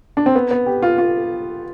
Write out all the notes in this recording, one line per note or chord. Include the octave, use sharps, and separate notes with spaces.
D4
C4
B3
B3
G4
F4
F4